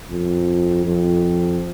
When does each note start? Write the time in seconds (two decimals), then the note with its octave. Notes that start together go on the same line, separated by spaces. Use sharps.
0.10 F2
0.85 F2